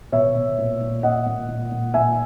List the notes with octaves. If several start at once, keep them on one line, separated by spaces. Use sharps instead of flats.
B2 C#5 E5
B2
A#2
A#2
A#2 D#5 F#5
A#2
A#2
A#2
A#2 E5 G#5